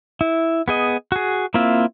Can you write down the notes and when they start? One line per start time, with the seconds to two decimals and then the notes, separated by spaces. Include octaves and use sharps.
0.21 E4
0.68 B3 G#4 D#5
1.12 F#4 G#4
1.54 A#3 C4 E4 F4 E5